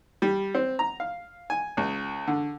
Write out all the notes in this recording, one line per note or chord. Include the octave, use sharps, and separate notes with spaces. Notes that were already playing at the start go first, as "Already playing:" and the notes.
G3
C4
A#5
F5
G#5
C#2
D3